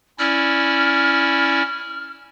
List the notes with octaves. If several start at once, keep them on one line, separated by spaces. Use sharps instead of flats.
C#4 E4 D5 F6